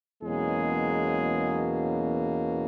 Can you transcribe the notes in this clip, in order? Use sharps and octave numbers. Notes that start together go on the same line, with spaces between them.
E2 B2 F#3 G#3 A#3 C#4 G#4